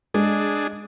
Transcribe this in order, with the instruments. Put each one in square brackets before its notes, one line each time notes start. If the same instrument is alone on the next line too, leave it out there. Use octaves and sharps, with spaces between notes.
[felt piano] G#3 [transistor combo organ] D4 G#4